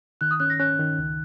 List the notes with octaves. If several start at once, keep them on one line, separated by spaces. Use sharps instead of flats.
D#3 F#6
D#6
C#4 F#6
A#6
C#4 F#6
D#3
C#2